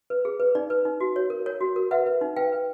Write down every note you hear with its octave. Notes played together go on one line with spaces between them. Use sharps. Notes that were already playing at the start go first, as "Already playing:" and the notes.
B4
G#4
B4
D#4 D5
B4
D#4
F#4
C#5
A#4
A#4 C#5
F#4
A#4
B4 E5 F#5
B4
D#4
B4 F5 G5
B4